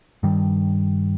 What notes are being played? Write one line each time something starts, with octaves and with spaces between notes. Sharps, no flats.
G2 D#3 G3